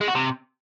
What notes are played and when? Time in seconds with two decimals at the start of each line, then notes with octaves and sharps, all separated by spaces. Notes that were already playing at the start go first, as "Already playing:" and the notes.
0.01 G#3
0.08 F#4
0.15 C3